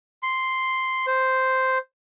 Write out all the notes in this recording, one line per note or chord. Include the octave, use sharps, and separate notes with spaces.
C6
C5